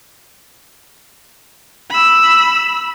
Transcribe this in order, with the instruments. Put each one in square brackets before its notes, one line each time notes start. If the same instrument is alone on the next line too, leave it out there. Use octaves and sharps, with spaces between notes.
[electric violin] B5 E6